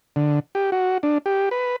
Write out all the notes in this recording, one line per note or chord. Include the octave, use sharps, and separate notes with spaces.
D3
G4
F#4
D4
G4
B4